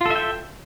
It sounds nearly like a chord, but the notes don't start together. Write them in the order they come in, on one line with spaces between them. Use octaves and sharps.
F4 A4 E5 G5